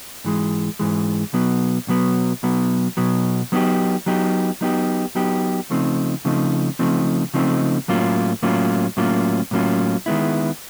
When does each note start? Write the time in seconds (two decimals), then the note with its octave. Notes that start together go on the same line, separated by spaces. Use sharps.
0.24 G#2 E3 G#3
0.79 G#2 E3 G#3
1.34 B2 F#3 B3
1.88 B2 F#3 B3
2.43 B2 F#3 B3
2.97 B2 F#3 B3
3.52 F#3 B3 D#4 G4
4.06 F#3 B3 D#4 G4
4.61 F#3 B3 D#4 G4
5.15 F#3 B3 D#4 G4
5.70 C#3 F3 A3 C4 D#4
6.25 C#3 F3 A3 C4 D#4
6.79 C#3 F3 A3 C4 D#4
7.34 C#3 F3 A3 C4 D#4
7.88 A2 F#3 A#3 C#4 F4
8.42 A2 F#3 A#3 C#4 F4
8.97 A2 F#3 A#3 C#4 F4
9.51 A2 F#3 A#3 C#4 F4
10.06 D#3 G#3 B3 E4